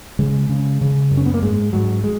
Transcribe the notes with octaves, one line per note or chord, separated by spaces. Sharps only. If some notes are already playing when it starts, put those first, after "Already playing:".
C#3 G#3
C#3
C#3
F#2
C#4
B3
A#3
G#2 G#3
G#2 F#3
G#3